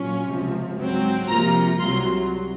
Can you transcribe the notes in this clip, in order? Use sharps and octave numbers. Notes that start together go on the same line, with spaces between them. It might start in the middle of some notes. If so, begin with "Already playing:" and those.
Already playing: A#2 F#3 C#4 F4
C#2 C3 F3
G#2 F#3 C4
C3 F3 A#3 F4 A#5
C2 C3 F#3 C6